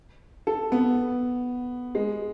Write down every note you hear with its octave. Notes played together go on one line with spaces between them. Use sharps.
A4
B3
G#3